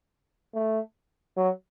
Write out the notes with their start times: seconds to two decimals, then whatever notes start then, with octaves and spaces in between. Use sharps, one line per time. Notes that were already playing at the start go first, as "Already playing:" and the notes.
0.55 A3
1.37 F#3